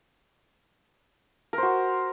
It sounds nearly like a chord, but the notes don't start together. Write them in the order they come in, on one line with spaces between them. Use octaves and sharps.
A#4 C5 F#4